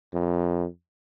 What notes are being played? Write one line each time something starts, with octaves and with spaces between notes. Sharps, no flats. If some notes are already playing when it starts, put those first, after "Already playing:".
F2